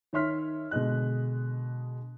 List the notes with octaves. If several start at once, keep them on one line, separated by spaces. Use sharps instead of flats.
D#3 C#5 E5 C6 F6 B6
B2 D3 G#3 D#5 F#6